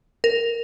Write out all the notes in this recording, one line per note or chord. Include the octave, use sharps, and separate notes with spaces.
A#4